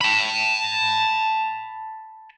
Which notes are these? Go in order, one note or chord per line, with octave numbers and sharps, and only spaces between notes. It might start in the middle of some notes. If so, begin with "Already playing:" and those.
A5 B5